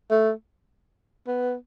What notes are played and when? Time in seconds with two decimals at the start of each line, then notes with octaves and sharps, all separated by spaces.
0.11 A3
1.28 B3